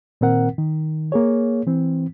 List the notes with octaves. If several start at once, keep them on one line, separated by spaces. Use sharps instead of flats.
A#2 D#3 C4 A#4 F#5
D#3
A#3 G#4 C#5
E3 C4